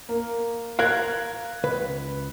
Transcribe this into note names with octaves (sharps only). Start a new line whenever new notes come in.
A#3
A#4 F5 F#6 G#6
C#2 B4